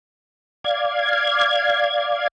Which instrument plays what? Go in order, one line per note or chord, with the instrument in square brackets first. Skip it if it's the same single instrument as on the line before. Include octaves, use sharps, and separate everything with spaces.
[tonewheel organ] D5 F5 G#6